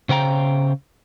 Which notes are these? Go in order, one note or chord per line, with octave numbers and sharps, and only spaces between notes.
C#3 C5 G5 A#5